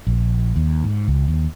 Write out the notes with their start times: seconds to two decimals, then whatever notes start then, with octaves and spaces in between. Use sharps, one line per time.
0.07 A#1
0.56 D#2
0.84 G#2
1.08 C#2
1.28 D#2